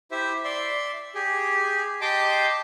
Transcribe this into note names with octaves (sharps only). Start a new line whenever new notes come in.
E4 G4 C5 E5
D5 E5 C6
G4 G#4
G4 D#5 G5 A5 C6 D6